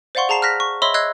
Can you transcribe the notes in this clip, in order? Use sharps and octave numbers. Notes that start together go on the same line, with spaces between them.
C5 D5 F5 F#5 C6 C#6
G#4 A5 A#5 C7 E7
F6 F#6 A#6 B6
C#6
C#5 D#5 E5 B5 C6 E6
D#5 E6 F#6 G#6 C7